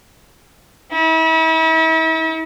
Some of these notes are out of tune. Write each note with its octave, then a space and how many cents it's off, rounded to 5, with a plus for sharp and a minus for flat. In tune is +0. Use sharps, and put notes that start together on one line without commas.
E4 -40